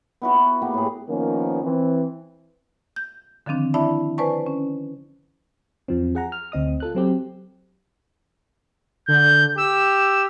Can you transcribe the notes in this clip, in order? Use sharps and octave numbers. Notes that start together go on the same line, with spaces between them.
B3 E4 F#4
F#4
A#3 B3 F#4 G4
A2 G#4
D#3 F3 A#3 B3 C#4
E3 C4
G6
D3 D#3 F3 C4 D4
D4 E4 D5 E5 A5 B5
B4 C5 D5 G#5 A5 C#6
C#4
E2 F3 C4
G#4 F#5 A#5
F6
D2 C4 D#5 D#6
F4 A4 F#6
F#3 C4 G4
D3 G6
G4 E6